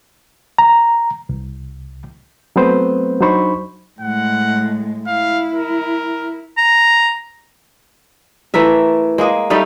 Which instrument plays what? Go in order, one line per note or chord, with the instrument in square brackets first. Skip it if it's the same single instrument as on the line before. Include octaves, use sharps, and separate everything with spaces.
[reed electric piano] A#5
C2
F#3 A3 B3 C4 B4 C5
F#3 D4 D#4 C5 B5 C#6
[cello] A2 G#3 [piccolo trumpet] F#5
[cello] E4 [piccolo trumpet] F5
[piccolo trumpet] A#4
[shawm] A#5
[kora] E3 A3 A#4 E5
G#3 A#3 D#5
G3 A3 D#4 F5